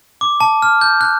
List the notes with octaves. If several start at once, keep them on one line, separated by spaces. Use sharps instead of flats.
D6
A5
F6
G6
F#6